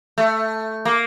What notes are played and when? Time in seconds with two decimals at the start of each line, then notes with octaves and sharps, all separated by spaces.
0.18 A3
0.85 A#3